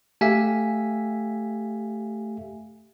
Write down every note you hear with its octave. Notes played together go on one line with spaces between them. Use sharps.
A3 G4 E5 F5 G#5 B6